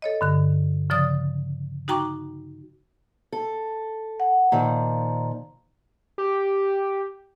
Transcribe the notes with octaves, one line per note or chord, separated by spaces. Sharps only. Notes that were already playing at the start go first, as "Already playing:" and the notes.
A4 C#5 D#5
G2 D3 F#6
C#3 F3 D5 D#6 A6
D#4 F#4 G5 A#5 C#6 D6
A4
F#5
A#2 D#3 F3 A#5
G4